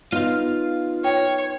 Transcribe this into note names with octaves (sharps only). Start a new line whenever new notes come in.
B3 D#4 F4 F5
C#5 G5